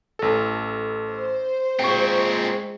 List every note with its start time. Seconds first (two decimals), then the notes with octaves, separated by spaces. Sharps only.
0.19 A1 A4
1.11 C5
1.79 A#2 G#3 C4 G5 C#6